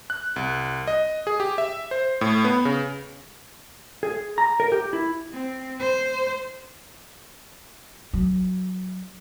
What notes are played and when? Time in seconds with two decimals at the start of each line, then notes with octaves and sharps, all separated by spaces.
0.10 F#6
0.36 C2
0.87 D#5
1.27 G#4
1.40 G4
1.58 E5
1.91 C5
2.21 A2
2.45 B3
2.65 C#3
4.03 G#4
4.38 A#5
4.60 A#4
4.72 G4
4.93 E4
5.32 C4
5.79 C5
8.13 F#3